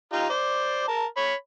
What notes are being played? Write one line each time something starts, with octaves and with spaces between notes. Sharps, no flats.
D#4 F4 G4
C5 D5
A#4 A5
C#5 B5